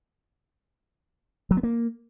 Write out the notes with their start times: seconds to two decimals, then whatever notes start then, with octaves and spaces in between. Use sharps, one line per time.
1.51 F#3
1.57 B3
1.63 A#3